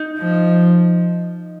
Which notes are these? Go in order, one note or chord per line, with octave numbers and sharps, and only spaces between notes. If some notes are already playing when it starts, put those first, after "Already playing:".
Already playing: D#4
F3